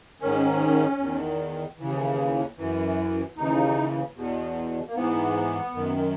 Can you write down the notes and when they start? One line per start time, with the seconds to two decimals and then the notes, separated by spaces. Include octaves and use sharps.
0.21 G#2 D#3 C#4
0.99 E2 D#3
1.79 D#2 C#3 E3
2.58 F#2 E3
3.37 D#2 C#3 E3 D#4
4.16 E2 B2
4.88 A#3
4.95 G#2 E3 B3
5.74 F#2 D#3